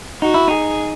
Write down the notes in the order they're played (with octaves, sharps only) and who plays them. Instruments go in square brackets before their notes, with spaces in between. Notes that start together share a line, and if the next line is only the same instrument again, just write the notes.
[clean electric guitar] D#4 [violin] F#4
[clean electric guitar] E4
[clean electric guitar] D#4 [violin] G#4